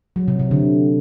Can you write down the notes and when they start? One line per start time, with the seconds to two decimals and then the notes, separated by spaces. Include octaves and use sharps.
0.16 F#3
0.28 C3
0.39 C3
0.51 D3